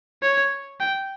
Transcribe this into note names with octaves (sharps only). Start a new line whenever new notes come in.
C#5
G5